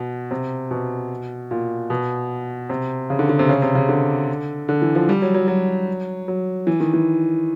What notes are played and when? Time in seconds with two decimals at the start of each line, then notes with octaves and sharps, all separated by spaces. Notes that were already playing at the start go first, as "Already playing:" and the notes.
Already playing: B2
0.31 C3
0.71 B2
1.51 A#2
1.90 B2
2.70 C3
3.10 C#3
3.19 D3
3.29 D3
3.39 C3
3.49 C#3
3.62 C3
3.75 C#3
3.89 D3
4.69 D3
4.82 E3
4.95 F3
5.09 G3
5.22 F#3
5.34 F#3
5.48 F#3
6.28 F#3
6.67 E3
6.80 D#3
6.94 E3